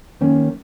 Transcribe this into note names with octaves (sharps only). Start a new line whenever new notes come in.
D#3 A#3 C#4